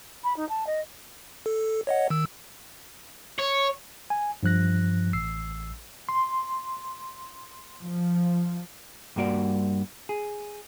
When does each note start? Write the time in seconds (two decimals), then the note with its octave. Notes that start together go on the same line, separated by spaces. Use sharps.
0.23 B5
0.36 D#4
0.49 A5
0.66 D#5
1.46 A4
1.87 C#5 D#5 F#5
2.10 D#3 E6
3.39 C#5
4.10 G#5
4.43 G2 F3 F#6 A#6
5.13 A1 E6 C7
6.09 C6
7.81 F3
9.16 G2 G3 A#3 F#4 D5
10.09 G#4